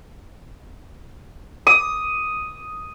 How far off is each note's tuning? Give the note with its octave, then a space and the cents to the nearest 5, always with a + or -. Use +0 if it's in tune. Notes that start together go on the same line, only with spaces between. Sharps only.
D#6 +5